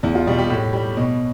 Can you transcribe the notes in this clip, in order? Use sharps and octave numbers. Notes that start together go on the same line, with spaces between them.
E2 E4
F4
B2 G3
G4
A2
G3
B2